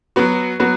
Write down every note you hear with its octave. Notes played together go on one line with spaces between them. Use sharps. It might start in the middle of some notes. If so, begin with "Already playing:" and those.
F#3 B3 F#4
F#3 B3 F#4